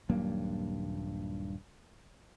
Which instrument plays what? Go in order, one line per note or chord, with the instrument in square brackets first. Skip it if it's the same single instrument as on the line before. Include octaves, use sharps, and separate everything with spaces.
[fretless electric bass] D#1 G2 F#3 A#3